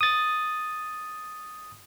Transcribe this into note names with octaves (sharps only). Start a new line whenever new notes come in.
D#6 A6